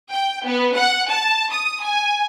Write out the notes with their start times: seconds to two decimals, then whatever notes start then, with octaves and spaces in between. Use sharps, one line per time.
0.11 G5
0.46 B3
0.76 F#5
1.09 A5
1.52 D#6
1.84 G#5